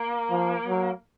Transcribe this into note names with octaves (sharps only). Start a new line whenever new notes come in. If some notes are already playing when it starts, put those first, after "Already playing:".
Already playing: A#3
F3
F#3